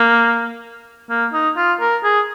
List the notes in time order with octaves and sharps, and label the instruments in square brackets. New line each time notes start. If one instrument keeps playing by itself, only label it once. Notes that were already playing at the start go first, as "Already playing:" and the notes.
Already playing: [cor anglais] A#3
A#3
D#4
F4
A#4
G#4